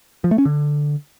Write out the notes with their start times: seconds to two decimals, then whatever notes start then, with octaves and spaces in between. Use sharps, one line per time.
0.24 F3
0.31 A3
0.38 C#4
0.45 D3